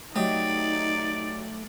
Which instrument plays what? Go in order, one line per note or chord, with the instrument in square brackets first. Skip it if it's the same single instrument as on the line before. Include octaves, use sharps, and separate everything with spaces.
[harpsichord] F#3 G4 D#5 [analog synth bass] A3 [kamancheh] D#4 [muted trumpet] D5